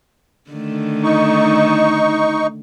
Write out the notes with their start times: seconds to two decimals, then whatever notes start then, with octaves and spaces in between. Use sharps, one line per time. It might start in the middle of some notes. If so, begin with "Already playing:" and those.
0.50 D3 D#3 A3
1.04 D#4 C#6